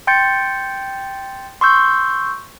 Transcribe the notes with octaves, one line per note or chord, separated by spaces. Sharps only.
G5 C6 G6 A6 C#7
C6 C#6 E6 G6